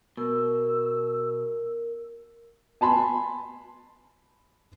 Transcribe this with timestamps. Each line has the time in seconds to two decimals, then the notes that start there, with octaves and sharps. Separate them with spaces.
0.17 B2 A#4 E6
2.81 G#5 A5 B5 C6